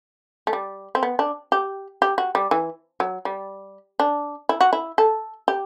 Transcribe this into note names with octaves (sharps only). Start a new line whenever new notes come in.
A3
G3
C4
B3
D4
G4
G4
F#4
G3
E3
F#3
G3
D4
E4
F#4
E4
A4
G4